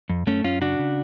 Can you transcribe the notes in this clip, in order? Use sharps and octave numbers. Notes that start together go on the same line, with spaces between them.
F2
F#2 A3 C#4
F#2 C#4 F4
C#3 D4 F#4
C#3